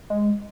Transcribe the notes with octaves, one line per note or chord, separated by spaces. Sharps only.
G#3